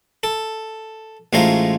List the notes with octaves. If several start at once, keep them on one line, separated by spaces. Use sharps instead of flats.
A4
A1 G#3 A3 F4 C5 A#5